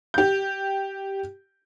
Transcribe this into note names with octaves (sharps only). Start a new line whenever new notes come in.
G4 G6